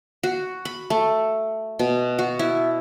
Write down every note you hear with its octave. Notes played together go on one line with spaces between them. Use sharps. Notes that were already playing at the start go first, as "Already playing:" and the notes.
F#4
B5
A3
B2
F#4
E4